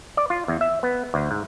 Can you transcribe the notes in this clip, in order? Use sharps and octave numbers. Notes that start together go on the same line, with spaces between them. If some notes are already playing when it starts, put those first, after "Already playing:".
D5
F4
E2
E5
B3
D2
G#2